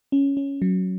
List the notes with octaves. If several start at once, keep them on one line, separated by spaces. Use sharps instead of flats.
C#4
C#4
F#3